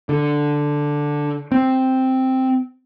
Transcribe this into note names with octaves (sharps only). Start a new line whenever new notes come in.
D3
C4